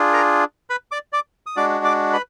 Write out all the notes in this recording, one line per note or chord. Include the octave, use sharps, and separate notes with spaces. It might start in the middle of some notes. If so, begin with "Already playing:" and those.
Already playing: D4 F4 G#4
A#4 A#5
B4 B5
D5 D6
D5 D6
D#6
G#3 D4 F#4 D5 D6
D5 D6
B4 B5